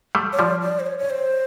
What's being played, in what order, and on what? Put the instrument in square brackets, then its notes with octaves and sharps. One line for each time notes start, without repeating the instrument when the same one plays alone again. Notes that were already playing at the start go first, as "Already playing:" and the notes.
[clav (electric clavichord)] G3 A3
[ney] C#5
[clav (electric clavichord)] F3 G3 [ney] D5
[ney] D5
C5
C#5
C#5
C5